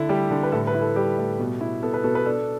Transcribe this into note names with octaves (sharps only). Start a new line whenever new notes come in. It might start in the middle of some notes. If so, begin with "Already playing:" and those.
Already playing: D3 E4 A4
G3 G4
D3
B4
A2 A4
B4
E4
A4
G3 G4
A2
B2
E4
B3 A4
B4
B2 A4
B4
D4 A4